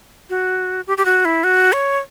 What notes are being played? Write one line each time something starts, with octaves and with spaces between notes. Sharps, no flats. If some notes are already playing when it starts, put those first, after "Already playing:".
F#4
G4
G4
F#4
E4
F#4
C#5